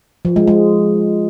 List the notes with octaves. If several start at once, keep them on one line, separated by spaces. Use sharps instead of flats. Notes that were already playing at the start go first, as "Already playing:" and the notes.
F3
G#3
G#3